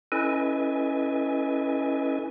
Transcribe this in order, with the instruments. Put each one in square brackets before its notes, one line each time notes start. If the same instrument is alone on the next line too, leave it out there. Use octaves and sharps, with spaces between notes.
[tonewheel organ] C#4 E4 A4 B4 D#5 G#5